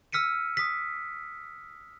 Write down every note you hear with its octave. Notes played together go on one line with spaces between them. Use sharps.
E6 F6 B6 C#7 D#7
D#6 B6